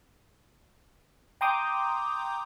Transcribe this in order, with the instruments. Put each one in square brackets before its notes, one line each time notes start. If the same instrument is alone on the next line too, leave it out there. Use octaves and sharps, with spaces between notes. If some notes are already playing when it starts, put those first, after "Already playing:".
[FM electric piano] G5 A#5 C6 D6 D#6 G6